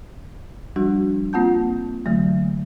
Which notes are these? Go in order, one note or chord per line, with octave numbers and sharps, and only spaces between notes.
F3 G3 D4 F#4
A#3 C4 F4 F#5 A5 G6
D3 E3 F#3 A3